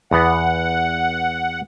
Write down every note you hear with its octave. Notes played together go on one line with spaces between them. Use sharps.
E2 B3 F#5